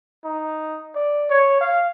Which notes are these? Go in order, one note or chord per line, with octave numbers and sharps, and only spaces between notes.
D#4
D5
C#5
F5